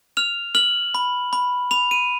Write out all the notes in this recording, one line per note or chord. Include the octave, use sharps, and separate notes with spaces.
F6 F7
F6 F#7
B5
B5
B5 F7
D#7